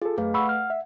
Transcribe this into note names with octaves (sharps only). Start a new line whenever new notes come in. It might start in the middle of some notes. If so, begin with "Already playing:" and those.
F4 G#4 A4
F#2 A3 B4 F5
F#5 B5 C#6 E6
F6
E5